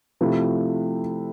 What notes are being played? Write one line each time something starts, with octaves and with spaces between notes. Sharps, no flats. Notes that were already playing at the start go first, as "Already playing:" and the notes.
C3 F3 A3 E4